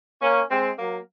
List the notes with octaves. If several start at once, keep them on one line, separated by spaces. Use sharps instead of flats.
A#3 C#4
G#3 C4
F#3 A#3